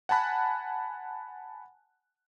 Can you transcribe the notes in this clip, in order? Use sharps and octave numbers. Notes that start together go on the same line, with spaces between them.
F#5 G#5 A5 B5 F#6